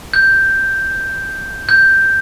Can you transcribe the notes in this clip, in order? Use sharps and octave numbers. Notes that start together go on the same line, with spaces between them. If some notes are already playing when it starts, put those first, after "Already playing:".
G6
G6